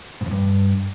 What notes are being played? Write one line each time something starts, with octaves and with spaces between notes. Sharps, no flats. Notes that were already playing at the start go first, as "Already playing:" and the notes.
G#2
F2
G2